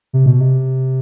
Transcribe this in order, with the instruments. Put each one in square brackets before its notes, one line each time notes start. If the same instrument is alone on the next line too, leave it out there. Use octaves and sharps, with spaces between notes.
[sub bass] C3
B2
C3